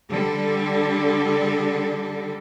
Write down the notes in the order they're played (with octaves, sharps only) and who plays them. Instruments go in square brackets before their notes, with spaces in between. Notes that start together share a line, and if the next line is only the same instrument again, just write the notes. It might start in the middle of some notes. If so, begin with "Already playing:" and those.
[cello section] D3 G3 A4